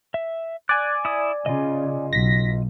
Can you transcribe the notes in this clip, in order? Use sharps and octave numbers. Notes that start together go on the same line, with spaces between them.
E5
D5 G#5 F#6
E4 D#6
C#3 F4 D#5
B1 A#6 B6